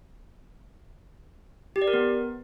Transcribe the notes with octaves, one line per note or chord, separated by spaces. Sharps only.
G4
D5
A#4
B3